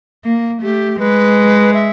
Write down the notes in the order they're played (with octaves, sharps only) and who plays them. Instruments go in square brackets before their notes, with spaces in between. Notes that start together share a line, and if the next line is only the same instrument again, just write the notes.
[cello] A#3
[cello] A3 [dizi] G4
[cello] G#3 [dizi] B4
[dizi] E5